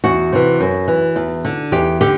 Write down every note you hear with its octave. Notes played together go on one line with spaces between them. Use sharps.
E2 F#4
C3 E3
F#2
E3
E2
D3
E2 G4
D3 G4